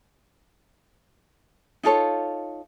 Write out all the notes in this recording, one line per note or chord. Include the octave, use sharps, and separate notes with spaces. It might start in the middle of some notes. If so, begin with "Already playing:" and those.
D#4 F4 A4 C#5